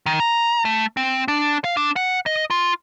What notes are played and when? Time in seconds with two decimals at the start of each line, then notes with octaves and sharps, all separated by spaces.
0.06 D#3
0.20 A#5
0.65 A3
0.97 C4
1.28 D4
1.64 F5
1.77 D4
1.96 F#5
2.26 D#5
2.50 F4